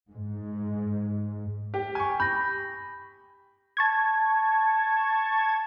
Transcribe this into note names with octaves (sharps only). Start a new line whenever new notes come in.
G#2
G4
G#5 C#6
B5 G6 A#6
A5 C#6 G#6